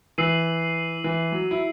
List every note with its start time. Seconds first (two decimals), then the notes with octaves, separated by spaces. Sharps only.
0.18 E3 E6 C7 D#7 F#7
1.04 E3
1.32 F#3
1.51 E4